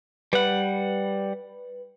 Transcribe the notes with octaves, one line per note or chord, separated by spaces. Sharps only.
G3 B4 F#5